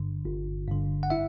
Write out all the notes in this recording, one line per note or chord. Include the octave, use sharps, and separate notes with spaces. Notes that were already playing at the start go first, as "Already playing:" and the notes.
Already playing: G1 G2 D3
G1
G2 D3
F#5
E4 E5